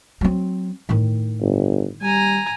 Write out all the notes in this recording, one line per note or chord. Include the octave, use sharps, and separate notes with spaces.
F#3 C4
A2 D#3
G1
G3 G#5 A#5